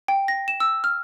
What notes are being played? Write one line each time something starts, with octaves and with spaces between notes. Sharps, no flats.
G5
A#6
E7
E6
F6